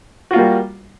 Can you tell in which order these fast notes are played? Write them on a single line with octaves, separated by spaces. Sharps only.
F#4 F4 A#3 G3